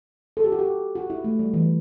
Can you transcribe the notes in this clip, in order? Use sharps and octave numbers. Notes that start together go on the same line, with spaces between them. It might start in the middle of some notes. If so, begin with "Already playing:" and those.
A4
G4
F#4
G4
F#4
E4
A3
G3
E3